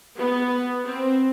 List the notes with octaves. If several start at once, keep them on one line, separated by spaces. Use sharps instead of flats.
B3
C4